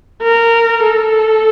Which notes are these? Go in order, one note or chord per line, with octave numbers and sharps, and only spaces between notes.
A#4
A4